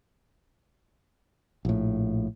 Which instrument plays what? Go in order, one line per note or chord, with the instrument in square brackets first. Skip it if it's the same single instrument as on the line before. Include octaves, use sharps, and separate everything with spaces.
[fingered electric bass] A#1 A2